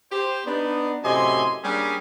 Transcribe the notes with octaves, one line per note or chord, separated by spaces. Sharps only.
G4 C5
B3 D4 D#4
F#2 A2 C3 D#5 G#5 C6
G3 A#3 C#4 D4 G4 G#4